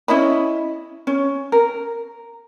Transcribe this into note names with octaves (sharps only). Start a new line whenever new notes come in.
C#4 E4 D#5 B5
C#4
A#4